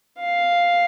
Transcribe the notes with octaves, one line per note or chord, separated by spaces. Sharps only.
F5